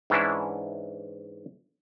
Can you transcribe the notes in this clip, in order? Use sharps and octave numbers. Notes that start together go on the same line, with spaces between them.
G#2 E3 C#4 D4 E4